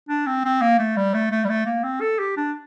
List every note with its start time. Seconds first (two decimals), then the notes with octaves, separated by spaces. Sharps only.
0.09 D4
0.27 C4
0.45 C4
0.61 A#3
0.79 A3
0.97 G3
1.14 A3
1.31 A3
1.44 G3
1.49 A3
1.66 A#3
1.84 C4
2.01 A4
2.19 G4
2.37 D4